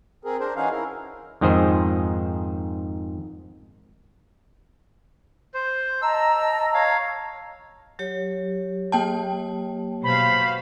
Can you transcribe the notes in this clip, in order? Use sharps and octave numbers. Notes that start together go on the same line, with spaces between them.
C4 G#4 A#4
D4 A#4 C5
E3 C#4 D#4 F#4 G#4 F5
E4 A#4
F2 G#2 D#3 G#4 C5
C5
D#5 A5 A#5 E6
C#5 F5
F#3 G4 C#5
A#3 G5 A5
B2 C5 F5 B5